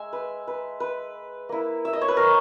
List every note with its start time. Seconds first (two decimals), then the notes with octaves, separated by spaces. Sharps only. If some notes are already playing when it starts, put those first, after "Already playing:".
Already playing: G#3 D#4 E5 G#5
0.13 B4
0.47 B4
0.80 B4
1.49 A#3 E4
1.85 E5
1.93 D#5
2.01 C#5
2.08 B4
2.17 A#4